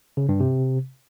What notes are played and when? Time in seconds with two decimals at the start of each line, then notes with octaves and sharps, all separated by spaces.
0.17 C#3
0.29 G2
0.40 C3